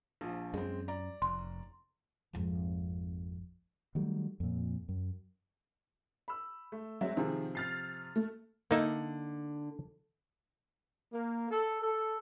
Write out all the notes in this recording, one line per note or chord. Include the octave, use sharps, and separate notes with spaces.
A#1 F3
F#2 G#3 C4
D5 A#5
F1 C6
G#1 F2
D#3 F#3 G3 A3
F2 A#2
F#2
B5 E6
A3
F#3 G#3 C4 E5
C3 D#3 F3 G#4
F6 A6 C7
A3
D3 A#3 D#4 E5
A#3
A4
A4